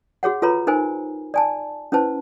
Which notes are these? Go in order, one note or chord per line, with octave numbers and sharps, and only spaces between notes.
F#4 G#4 C#5 F#5
F4 A4 B4 C#5 A#5 B5
D#4 A#4 C5 G#5
D5 G#5 A5
C#4 E4 B4 C5 A5